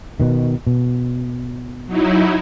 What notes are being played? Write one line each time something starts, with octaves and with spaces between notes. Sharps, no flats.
B2 D#3
B2
F#3 D#4 E4